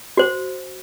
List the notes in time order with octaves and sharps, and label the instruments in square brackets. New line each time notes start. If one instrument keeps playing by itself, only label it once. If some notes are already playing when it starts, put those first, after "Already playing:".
[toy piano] F#4 C5